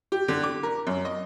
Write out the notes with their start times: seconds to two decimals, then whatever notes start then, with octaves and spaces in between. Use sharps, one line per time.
0.12 G4
0.28 D3
0.44 D6
0.63 A#4
0.87 F#2
1.05 D#5